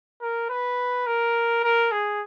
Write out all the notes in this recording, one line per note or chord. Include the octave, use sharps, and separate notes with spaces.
A#4
B4
A#4
A#4
G#4